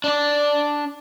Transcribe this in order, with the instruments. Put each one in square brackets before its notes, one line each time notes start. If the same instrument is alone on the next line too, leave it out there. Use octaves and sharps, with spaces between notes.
[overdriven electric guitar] D4 D5